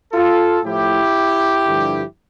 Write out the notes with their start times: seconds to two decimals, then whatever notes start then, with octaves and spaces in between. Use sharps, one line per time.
0.13 F4 A4
0.63 A2 F3 E4 G4
1.67 G2 D3 F3